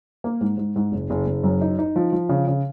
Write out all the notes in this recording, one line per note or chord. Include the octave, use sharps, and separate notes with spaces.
A#3
G#2
G#2
G#2
F#1
F#1
F#1
F#2
D#4
D#4
F3
F3
C#3
C#3